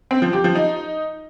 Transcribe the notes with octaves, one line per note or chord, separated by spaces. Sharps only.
C4
F3
G4
F3
D#4